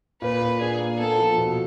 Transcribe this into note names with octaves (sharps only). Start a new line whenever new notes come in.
A#2 B4
A#2
D4 G#4
A#3
B3 A4
F3
B2